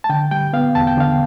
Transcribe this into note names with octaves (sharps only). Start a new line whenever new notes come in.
A5
D3 G5
G3 G5
B3 F5
E2 A5
G5
D3 F5